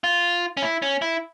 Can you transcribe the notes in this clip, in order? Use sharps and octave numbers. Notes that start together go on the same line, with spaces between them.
F4
C#4
E4
C#4
E4